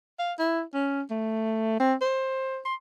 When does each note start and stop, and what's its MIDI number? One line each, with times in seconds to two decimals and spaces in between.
0.19 0.33 77
0.39 0.62 64
0.74 1.02 61
1.10 1.78 57
1.80 1.94 60
2.01 2.59 72
2.65 2.74 84